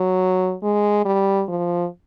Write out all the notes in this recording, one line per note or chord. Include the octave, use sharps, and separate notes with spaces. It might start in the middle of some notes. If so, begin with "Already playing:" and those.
Already playing: F#3
G#3
G3
F3